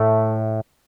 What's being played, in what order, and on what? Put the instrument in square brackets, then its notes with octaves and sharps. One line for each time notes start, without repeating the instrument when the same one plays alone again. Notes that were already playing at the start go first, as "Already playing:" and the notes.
Already playing: [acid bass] A2 [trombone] A3